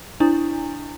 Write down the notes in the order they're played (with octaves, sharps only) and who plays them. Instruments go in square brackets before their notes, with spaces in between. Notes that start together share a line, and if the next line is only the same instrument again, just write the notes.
[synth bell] D4 E4